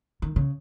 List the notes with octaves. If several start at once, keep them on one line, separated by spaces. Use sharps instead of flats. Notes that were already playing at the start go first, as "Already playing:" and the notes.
D#3
C#3